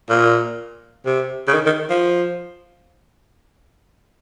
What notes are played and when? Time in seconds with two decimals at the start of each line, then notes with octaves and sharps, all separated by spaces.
0.09 A#2
1.06 C3
1.48 C#3
1.54 D#3
1.66 D#3
1.90 F3